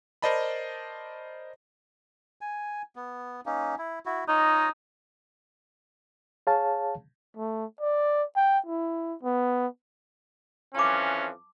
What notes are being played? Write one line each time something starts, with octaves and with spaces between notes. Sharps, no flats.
A#4 C5 D5 D#5 A5 B5
G#5
B3
A#3 C#4 D#4
E4
E4 F#4
D#4 F4 C#5 D#5
G#4 C#5 F5 A5
A3
D5
G5
E4
B3
F2 E3 C#4 A5 D6